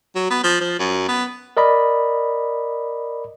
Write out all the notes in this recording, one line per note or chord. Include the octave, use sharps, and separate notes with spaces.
F#3
B3
F3
F3
F#2
B3
A#4 D5 D#5 B5